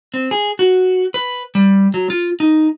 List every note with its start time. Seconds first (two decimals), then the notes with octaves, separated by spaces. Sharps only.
0.14 C4
0.31 G#4
0.59 F#4
1.14 B4
1.55 G3
1.94 F#3
2.10 F4
2.40 D#4